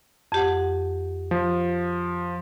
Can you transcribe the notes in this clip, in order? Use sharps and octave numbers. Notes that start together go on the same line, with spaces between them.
F2 G4 F#5
F3